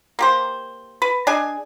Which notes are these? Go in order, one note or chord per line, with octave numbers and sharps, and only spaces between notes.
A#3 G4 C5
B4
D4 G#4 D#5 G#5